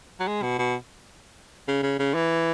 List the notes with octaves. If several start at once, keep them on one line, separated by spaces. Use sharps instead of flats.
F#3
G#3
B2
B2
C#3
C#3
C#3
E3